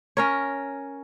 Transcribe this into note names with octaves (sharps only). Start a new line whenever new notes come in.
C#4 A#4 C#5